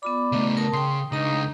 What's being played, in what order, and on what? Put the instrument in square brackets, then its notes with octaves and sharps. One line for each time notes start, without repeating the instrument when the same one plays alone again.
[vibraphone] B3 F4 B5 [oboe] D5
[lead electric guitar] C#3 A3 [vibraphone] B3 D#5 A#5
[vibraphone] A#4 A5 D#6
[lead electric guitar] C#3 [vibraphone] G5 D#6 [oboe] C6
[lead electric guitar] C#2 [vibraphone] D4 D#5 A#5 [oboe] D#4